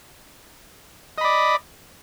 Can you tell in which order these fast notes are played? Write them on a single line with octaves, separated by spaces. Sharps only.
D#5 B5 D5